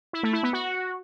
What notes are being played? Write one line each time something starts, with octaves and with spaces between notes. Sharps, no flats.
E4
A3
E4
B3
F#4